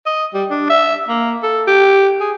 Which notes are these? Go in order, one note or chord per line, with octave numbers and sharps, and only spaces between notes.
D#5
G3
D4
E5
A#3
A4
G4
G#4